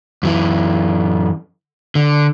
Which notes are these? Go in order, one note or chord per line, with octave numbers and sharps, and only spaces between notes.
F#2 E3
D3